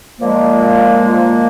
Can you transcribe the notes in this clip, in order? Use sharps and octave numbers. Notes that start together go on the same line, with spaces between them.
A#2 F3 G#3 A#3
A#2 F3 G#3